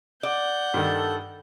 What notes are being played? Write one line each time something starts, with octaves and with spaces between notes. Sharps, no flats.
D5 F#5 G6
G2 D#3 A4